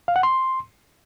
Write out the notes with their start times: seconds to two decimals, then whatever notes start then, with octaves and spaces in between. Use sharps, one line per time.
0.08 F5
0.16 F#5
0.23 C6